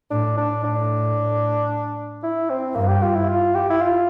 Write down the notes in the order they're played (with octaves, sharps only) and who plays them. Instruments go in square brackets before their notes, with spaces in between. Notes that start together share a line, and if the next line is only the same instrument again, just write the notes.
[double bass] A2 [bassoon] D4
[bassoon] D4
[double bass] A2 [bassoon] D4
[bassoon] E4
C4
[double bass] G2 [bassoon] A#3
[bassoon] G4
F4
E4
F4
G4
E4
F4